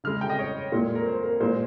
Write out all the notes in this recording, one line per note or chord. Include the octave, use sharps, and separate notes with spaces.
C#3 G#3 F6
G5
D#5
C#5
A#2 G#3
A#4
C5
A#4
A#2 G#3 C5